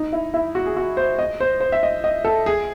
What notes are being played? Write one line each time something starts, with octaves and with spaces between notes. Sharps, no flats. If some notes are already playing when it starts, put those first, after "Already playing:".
Already playing: D#4
E4
E4
F#4
G#4
F#4
C5
D#5
C5
C5
E5
D#5
D#5
A4
G#4